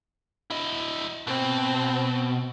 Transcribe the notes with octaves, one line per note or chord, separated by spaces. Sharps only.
E4 D#5
B2 C4